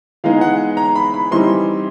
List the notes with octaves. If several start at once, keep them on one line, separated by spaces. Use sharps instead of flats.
E3 G#3 B3 D#4 F5
F#5
A#5
B5
B5
E3 G3 C4 D#4 C6